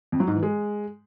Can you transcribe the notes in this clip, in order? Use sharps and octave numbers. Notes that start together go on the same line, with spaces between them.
F2
F#3
G#2
E3
G#3